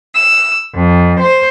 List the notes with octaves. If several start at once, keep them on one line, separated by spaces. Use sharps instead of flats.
E6
F2
C5